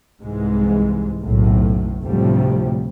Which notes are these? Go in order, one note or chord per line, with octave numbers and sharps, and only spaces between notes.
C2 G#2 E3 G#3
F#1 B1 A2
D2 A2 C3 F3 G3